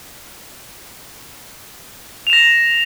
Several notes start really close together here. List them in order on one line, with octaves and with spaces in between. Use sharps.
F7 E7 A#6